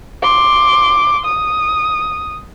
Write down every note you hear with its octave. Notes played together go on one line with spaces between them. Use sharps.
C6 D6
D#6